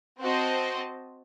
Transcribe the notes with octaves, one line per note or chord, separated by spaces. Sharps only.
C4 F#4 C5 D#5 A5